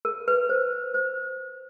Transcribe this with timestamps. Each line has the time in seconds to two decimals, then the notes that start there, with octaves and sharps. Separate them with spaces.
0.05 A#4
0.28 B4
0.49 C5
0.94 C5